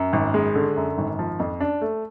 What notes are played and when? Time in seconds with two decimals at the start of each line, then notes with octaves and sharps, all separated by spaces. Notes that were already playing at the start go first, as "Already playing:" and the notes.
Already playing: F#2
0.13 G#1
0.34 G#3
0.55 D3
0.76 F#2
0.98 G#1
1.19 F3
1.40 F2
1.60 D4
1.81 A3